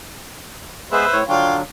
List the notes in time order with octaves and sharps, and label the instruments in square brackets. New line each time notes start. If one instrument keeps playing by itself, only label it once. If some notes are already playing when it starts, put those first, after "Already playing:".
[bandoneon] G#3 B3 G#4 [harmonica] B4 C5 E5
[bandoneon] A2 C#5
[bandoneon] D3 F#3 D4 [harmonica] F4 C#5 G5